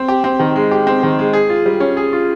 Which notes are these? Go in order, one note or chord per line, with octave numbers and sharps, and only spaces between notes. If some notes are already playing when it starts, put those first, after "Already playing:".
Already playing: C4
G4
C4
D#3
G#3
G4
C4
D#3
G#3
G#4
F4
G3
C#4
G#4
F4